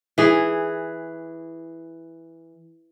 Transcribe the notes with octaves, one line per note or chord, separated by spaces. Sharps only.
E3 G#4